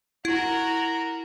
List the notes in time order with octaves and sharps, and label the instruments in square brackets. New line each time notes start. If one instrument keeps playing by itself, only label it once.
[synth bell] E4 [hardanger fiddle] F#4 A#4